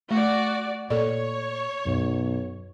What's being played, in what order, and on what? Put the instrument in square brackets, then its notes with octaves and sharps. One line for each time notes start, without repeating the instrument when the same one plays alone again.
[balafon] A3 [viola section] F#4 D5
[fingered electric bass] A#2 [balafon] A4 D5 [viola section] C#5
[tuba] B1 [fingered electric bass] F#2